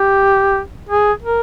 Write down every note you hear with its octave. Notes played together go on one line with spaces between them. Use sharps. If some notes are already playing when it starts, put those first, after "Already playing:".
Already playing: G4
G#4
A#4